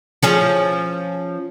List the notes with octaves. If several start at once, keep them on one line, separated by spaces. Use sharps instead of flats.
F3 C#4 G#4